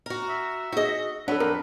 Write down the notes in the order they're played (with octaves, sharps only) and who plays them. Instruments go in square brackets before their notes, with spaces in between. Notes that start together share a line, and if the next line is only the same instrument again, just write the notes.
[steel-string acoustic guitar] F#4 A#4
[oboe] E5
[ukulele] D#4 G#4 [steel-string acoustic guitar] F#4 D#5
[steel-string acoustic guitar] F#3 [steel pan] D4 [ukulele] A4 F#5 [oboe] B4
[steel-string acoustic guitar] F2 [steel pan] A#4